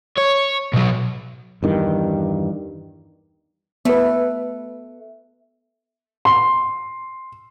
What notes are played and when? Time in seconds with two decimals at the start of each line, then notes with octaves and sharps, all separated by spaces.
0.17 C#5
0.73 B2 F#3
1.63 E2 G2 D#3
3.85 A3 B3 B4
6.25 C6